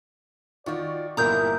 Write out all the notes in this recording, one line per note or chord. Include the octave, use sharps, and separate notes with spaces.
D#3 F4 F#4 D5 C#6
G1 A#2 G#3 E4 A#4 A#5 D#6 G6